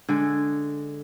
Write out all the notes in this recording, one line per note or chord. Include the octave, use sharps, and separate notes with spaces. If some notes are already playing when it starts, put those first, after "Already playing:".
D3 G#3 G#4